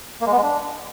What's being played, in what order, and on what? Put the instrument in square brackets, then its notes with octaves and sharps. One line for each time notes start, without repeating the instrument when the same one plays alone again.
[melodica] A#3
G#3
B3
G#3
D4